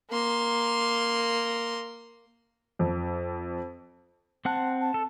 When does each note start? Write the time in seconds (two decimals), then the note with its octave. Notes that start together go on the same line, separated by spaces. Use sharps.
0.10 A#3 C6
2.79 F2
4.45 C4 F#5 A5 F#6
4.81 A5
4.94 A4